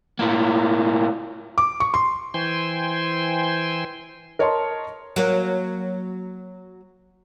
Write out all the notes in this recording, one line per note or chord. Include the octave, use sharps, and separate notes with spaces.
A2 A#3
D6
C#6
C6
E3 C5 G5 G#5 C6
A#4 C#5 D#5 A5 C6
F#3 A#3